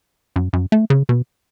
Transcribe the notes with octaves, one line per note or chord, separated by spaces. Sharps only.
F#2
F#2
A3
C#3
B2